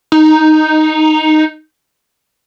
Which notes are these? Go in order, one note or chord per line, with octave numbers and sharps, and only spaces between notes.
D#4